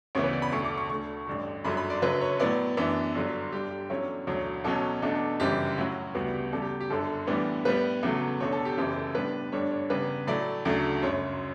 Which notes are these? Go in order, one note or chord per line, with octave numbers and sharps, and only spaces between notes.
D2 C#3 E3 B3 E4 C#5
B4
D5
B5
E1 D2 D3 A3 C#6
D6
C#6
D2 D3 A3 C#6
A1 G2 D3
G1 F#2 D3 F#3 B5
B5
D5
F#1 F#2 D3 F#3 B4
C#5
A2 F#3 B3 E4 D5
F#2 E3 B3 D4 E5
G1 G2 D3 F#3
G2 D3 G3 G4
G4
E2 D3 F#3 C#4 E4 C#5
E1 D2 D3 F#3 C#5
E2 B2 F#3 C#4 A4
E2 B2 A3 D4
G1 F#2 C#3 E3 G3 G4
A2 F#3 C#4 E4 F#4
D2 C#3 G3 B3 F#4
G4
E2 C#3 G3 A4
G4
G4
G1 F#2 D3 A4
A2 E3 G3 B3 D4
A2 G3 B3 B4
E2 C#3 F#3 A3
E1 E2 D3 C#5
A4
G4
F#1 F#2 C#3 E3 A3 G4
A4
A2 G3 B3 D4 B4
G2 D3 G3 D4 C#5
C#5
E2 C#3 G3 B4
A2 F#3 A3 E4 D5
D2 C#3 F#3 A3 D4
G1 F#2 C#3 C#5